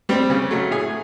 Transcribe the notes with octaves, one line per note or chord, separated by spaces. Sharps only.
G3 C4
C#3
F#3 A3
A2 G#4